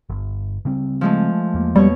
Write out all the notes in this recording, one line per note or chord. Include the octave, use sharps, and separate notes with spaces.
G1
C#3 G3 C4
F3 G#3 A3
E2 A#3
B2 G3 C#5